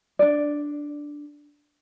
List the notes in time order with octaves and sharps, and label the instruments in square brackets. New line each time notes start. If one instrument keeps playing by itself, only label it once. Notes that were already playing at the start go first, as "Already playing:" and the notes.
[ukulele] D4 D5